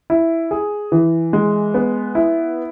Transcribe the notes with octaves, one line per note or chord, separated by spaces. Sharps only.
E4
G#4
E3
G#3
B3
E4